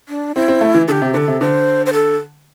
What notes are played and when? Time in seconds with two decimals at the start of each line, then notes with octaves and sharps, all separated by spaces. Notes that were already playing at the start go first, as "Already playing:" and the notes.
0.09 D4
0.35 C4 E4
0.48 C4
0.61 A3
0.74 E3
0.88 D3 G4 A4
1.02 C3
1.14 D3 A4 C5
1.28 C3
1.41 D3 C5
1.86 C5
1.93 A4